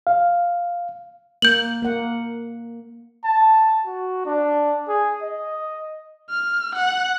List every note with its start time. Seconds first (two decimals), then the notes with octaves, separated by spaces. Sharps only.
0.07 F5
1.42 A#3 G6 F#7
1.82 A#3 F#5
3.24 A5
3.85 F#4
4.26 D4
4.88 G#4
5.22 D#5
6.30 F6
6.76 F#5